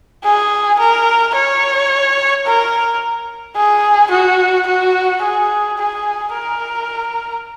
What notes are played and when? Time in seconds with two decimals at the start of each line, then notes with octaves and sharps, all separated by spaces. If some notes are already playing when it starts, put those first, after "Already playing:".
0.24 G#4
0.79 A#4
1.35 C#5
2.46 A#4
3.56 G#4
4.11 F#4
4.67 F#4
5.22 G#4
5.78 G#4
6.34 A#4